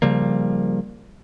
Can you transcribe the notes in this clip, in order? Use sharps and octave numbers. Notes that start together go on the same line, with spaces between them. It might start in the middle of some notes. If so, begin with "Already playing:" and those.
C#3 F3 G3 A#3